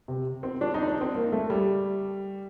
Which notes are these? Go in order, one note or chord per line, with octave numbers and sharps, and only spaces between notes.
C3
C4
D4
D#4
D4
C4
A#3
A3
G3